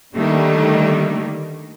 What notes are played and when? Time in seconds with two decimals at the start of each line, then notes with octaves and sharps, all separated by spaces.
0.14 D3 D#3 G3 A3 A#3